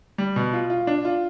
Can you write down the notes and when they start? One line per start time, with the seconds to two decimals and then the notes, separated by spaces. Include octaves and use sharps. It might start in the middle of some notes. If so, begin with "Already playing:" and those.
0.18 G3
0.36 B2
0.53 F4
0.70 F4
0.87 D4
1.05 F4